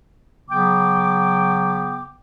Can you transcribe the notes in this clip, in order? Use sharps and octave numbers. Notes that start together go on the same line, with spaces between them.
C#3 F#3 B3 G5 D6